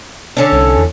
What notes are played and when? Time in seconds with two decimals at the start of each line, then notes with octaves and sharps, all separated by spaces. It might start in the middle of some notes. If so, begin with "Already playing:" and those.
0.37 D3 C#4 D4
0.52 C2
0.77 E2